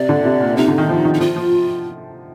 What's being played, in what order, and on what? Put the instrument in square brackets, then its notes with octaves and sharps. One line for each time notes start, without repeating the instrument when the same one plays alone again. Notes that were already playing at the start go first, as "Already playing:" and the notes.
Already playing: [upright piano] C3 [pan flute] D5
[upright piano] D3
C3
A#2
[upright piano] C3 [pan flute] D#4
[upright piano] D3
D#3
F3
D#3
[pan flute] D#4
[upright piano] F3 [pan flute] F4
[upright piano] F3